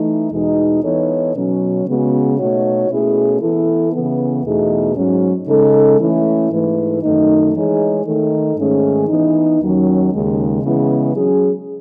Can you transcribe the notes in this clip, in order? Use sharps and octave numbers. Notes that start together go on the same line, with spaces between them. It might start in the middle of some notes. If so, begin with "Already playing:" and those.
Already playing: E3 A3 D#4
E2 B2 G#3 D#4
E3 B3 D#4 A4 C#5
B2 F#3 C#4
C#3 G#3 B3 F#4
B2 A3 D#4 F#4 C#5
B2 A3 C#4 E4 G#4
E3 B3 E4 A4
C#3 E3 B3
E2 B2 A3 D#4 G#4
G#2 F#3 C#4
C#3 G#3 D#4 A4
E3 A3 C#4 E4
G#2 E3 A3 E4 B4
F#2 D#3 A3 D#4
E3 G#3 D#4 G#4 C#5
D#3 A3 D#4 A4
G#2 D#3 A3 C#4 G#4
E3 B3 D#4
D#2 D#3 F#3 C#4
D#2 C#3 G#3
C#3 E3 G#3 B3 E4
F#3 C#4 G#4